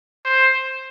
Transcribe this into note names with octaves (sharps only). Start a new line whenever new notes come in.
C5